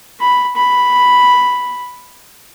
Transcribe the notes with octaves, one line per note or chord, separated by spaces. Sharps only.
B5
B5